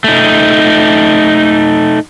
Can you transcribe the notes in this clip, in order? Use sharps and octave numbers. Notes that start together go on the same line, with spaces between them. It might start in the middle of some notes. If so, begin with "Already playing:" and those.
A3 D#4